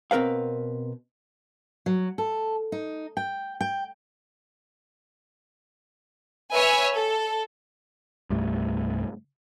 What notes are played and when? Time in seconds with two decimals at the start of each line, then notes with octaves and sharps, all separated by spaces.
0.11 B2 C4 A#4 B4 F5
1.86 F#3
2.18 A4
2.72 D#4
3.17 G5
3.61 G5
6.54 B4 C#5 E5 G#5
6.94 A4
8.30 C2 G2 A3